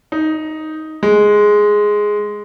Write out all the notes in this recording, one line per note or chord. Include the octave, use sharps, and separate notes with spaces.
D#4
G#3